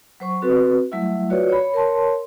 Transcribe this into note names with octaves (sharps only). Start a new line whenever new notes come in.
F#3 C5 C#6
C4 F#4 A4 B4
F#3 G3 A3 E4 E5
F4 F#4 B4 C#5 D5
C#5 B5
A#4 C#5 A5 C6